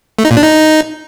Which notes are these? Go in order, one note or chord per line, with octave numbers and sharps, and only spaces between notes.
A3
D#4
A#2
D4
D#4